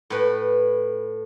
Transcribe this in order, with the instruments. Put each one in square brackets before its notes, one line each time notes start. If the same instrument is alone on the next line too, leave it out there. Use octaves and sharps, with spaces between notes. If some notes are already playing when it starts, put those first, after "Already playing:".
[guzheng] A2 B4